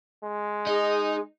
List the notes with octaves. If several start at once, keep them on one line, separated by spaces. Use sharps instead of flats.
G#3
D#4 G#4